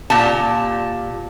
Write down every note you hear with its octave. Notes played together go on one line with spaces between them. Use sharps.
A#2 G4 A5